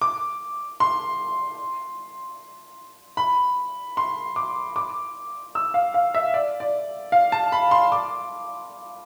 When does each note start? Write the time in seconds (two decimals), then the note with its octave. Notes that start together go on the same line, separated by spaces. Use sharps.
0.02 D6
0.80 C6
3.17 B5
3.97 C6
4.36 D6
4.76 D6
5.55 E6
5.74 F5
5.94 F5
6.14 E5
6.34 D5
6.60 D5
7.12 F5
7.32 A5
7.52 B5
7.71 C6
7.92 D6